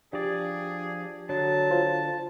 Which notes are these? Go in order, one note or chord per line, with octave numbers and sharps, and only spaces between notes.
F3 D4 G4 G#4 D5
D3 F#3 A5
F4 C5